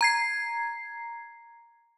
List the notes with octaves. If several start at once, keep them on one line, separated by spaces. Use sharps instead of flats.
A#5 G#6 C7